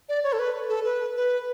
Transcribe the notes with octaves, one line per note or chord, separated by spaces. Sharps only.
D5
C#5
A4
B4
A4
B4
B4